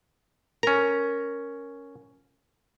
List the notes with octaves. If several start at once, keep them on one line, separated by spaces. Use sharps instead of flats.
C#4 A#4 A#5